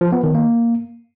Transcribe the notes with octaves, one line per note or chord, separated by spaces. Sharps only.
F3
B3
D#3
A#3